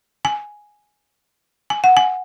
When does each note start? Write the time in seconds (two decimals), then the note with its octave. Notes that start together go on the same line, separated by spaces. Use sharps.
0.25 G#5
1.70 G#5
1.84 F#5
1.97 G#5